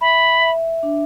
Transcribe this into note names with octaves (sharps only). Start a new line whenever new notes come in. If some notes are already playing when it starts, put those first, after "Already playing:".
E5 B5
E5
D4